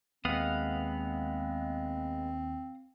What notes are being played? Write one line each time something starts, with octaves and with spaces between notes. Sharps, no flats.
D#2 G#3 B3 C4 F5 F#5 D#6